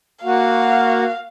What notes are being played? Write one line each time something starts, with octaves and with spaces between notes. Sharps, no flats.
A#3 F#4 F5